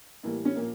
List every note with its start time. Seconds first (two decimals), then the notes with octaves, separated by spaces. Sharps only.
0.23 A2 E3 G3 A#3
0.45 C#4
0.56 A#2 F3 A#3